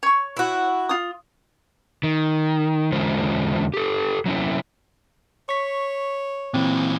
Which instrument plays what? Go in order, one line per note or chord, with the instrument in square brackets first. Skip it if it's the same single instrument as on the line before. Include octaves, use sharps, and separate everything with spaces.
[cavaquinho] C#5 C#6
[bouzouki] E4 F#4
[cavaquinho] F4 D#6
[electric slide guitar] D#3
E2 D3 G#3 C#4 F4 C5
G4 A4
F#3 C#4 E4
[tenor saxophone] C#5 [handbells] C#6 B6
[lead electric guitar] A#2 E3 [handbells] C4